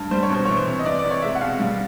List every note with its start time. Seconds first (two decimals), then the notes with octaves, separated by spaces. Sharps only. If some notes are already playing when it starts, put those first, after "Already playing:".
Already playing: G2
0.11 G3 C5
0.23 C#5
0.30 B2 C5
0.45 E3 C#5
0.57 C5
0.67 C3
0.79 D#5
0.85 E3 D5
0.99 D5
1.05 C3
1.11 C#5
1.22 G#3 E5
1.35 F#5
1.41 B2 F5
1.59 G3